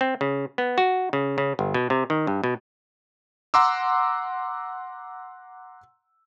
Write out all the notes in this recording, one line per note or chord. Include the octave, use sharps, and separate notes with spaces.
C4
C#3
B3
F#4
C#3
C#3
G1
B2
C3
D#3
G2
B2
F#5 A#5 C6 D6 E6